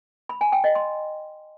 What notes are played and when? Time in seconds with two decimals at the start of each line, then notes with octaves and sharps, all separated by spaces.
0.29 B5
0.41 G#5
0.52 G5
0.64 D#5
0.75 C6